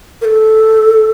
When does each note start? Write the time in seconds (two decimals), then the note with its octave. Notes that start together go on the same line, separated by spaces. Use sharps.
0.21 A#4
0.25 A4